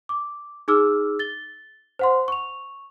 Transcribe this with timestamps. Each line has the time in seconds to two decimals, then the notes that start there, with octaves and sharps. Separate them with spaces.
0.09 D6
0.68 D#4 G#4 D6 E6 F6
1.19 A6 G7
1.99 C5 F#5 C6
2.28 C#6 F7